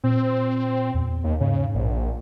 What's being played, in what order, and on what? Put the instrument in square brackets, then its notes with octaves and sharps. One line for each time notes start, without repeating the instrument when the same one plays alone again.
[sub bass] A#2 [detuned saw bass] C4
[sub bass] E2
[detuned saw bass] D#2
[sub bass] G#2 [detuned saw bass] C#3
[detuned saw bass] A#1